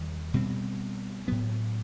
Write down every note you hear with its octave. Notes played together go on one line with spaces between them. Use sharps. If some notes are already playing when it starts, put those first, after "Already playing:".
Already playing: E2 D#3 G3
B2 G3 C4
A2 F#3 B3